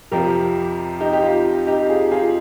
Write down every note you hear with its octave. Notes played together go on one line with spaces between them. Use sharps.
F2 C3 F3 G4 A#4
D#4 G4
G4
F4
D#4 G4
F4 G#4
F4 G#4